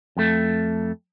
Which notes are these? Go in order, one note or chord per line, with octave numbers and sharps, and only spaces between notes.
F2 A3